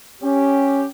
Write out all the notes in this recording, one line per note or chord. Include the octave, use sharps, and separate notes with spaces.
C#4 G4